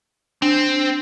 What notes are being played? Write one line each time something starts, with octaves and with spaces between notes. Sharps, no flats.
C4 D4